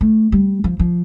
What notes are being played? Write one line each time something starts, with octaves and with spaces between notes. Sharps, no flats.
A3
G3
F3
F3